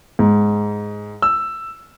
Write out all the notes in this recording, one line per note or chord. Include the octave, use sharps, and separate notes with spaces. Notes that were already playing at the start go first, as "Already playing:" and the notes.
G#2
E6